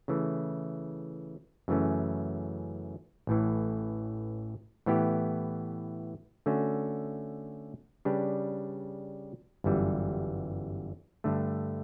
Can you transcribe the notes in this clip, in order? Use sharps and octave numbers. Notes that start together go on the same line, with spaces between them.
C#3 E3 A3
F#2 C#3 E3 A3 C#4
A1 A2 E3
A2 E3 B3 E4 G4
D3 A3 C#4 F#4
C#3 G3 D4 G4 B4
G1 F#2 E3 G3
G2 D3 A3